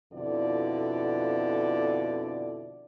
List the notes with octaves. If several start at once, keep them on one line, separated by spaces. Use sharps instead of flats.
F2 B2 D3 E4 F4 D5